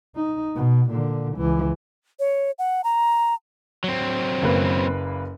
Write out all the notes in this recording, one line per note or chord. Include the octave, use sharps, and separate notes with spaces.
D#4
B2
A#2 D3
C#2 E3
C#5
F#5
A#5
F#3 C4
F#1 A#3 B4